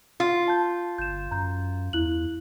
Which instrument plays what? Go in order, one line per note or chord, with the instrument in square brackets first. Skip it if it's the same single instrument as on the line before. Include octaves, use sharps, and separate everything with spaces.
[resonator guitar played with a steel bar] F4
[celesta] A5 G6
[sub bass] G1 [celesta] G6 E7
[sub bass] F#2 [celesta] A#5 G6
[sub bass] E2 [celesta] E4 F#6 F#7